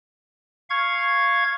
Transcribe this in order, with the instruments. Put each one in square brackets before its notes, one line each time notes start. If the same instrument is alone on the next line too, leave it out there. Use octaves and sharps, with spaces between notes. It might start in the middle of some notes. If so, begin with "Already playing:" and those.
[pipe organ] F5 C#6 G#6